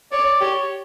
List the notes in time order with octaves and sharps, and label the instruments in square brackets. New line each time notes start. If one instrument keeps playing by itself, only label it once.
[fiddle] C#5 [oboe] D5
[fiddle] G4 [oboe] C#5